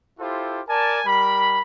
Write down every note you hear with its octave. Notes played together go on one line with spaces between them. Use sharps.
E4 F4 G4 A4 C5
A#4 D5 G#5 A5
G3 A#4 B5